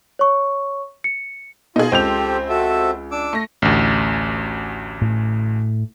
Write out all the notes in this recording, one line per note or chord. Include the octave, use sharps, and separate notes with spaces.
C#5 C#6
C#7
B2 D#4 F4 G#4
C#2 C4 G4 A4 G6 F7
F#4 A4 E5
D4 D6 E6
A3 A#6
A1 D2
A2